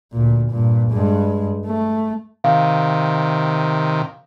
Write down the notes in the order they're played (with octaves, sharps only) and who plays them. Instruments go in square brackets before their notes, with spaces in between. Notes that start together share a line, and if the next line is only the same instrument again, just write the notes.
[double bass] D2 A#2
G2 A#2
G2 G#3
A3
[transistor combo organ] C3 D#3 [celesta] F5